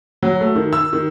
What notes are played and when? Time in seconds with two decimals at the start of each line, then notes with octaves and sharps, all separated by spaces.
0.22 F#3
0.41 A3
0.56 D#3
0.73 E6
0.93 D#3